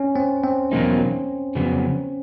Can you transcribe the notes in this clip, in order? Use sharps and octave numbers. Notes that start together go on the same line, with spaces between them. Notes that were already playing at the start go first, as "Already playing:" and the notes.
Already playing: C#4
C4
C4
E2 B2 F#3 A#3 D#4
F2 C#3 F#3 B3